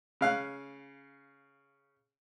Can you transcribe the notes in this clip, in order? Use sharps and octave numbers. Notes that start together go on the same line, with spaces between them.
C#3 F5 F#6